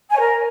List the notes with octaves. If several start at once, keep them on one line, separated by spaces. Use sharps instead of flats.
G#5
C#5
A#4